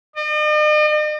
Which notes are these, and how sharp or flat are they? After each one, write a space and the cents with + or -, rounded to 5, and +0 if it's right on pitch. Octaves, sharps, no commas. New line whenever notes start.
D#5 -45